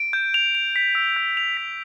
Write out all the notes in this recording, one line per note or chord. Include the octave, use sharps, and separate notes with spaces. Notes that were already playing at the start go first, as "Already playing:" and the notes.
Already playing: D7
G6
F7
F7
B6
E6
G6
F7
B6